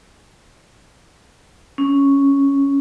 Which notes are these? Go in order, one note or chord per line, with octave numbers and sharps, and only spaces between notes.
C#4